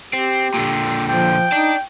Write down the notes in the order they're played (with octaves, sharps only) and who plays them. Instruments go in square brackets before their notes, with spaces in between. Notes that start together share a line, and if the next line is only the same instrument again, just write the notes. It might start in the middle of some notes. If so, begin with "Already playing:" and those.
[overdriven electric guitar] C4 [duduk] G4
[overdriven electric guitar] A#2 D3 [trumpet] G5
[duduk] F3 [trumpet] G5
[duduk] D#4 [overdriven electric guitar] D5 A5